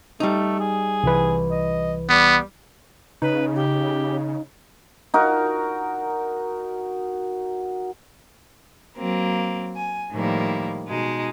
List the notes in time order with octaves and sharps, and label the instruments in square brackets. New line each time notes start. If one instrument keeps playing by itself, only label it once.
[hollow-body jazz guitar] G3 D#4 [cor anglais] A3
[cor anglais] G#4
[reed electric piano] C2 E3 B4
[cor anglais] D#5
[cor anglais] G3 [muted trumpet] B3
[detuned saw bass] C#3 [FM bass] D#4 [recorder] B4
[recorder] G4
[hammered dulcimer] D#4 F#4 A#4
[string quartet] F#3 A#3 C4
G#5
A2 D#3 F3 G3 A#3 E4
B2 G#3 D#4